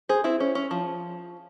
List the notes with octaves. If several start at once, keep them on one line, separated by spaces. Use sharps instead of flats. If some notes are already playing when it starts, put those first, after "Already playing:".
G#4 C5
C4 E4
C#4
C#4
F3